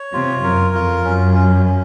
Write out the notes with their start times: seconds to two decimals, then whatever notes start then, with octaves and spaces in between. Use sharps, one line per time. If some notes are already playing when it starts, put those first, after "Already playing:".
Already playing: C#5
0.13 C3 F4
0.44 F#2 A#4
0.74 F2 F4
1.05 F#2 C#4
1.35 C#4
1.65 C#4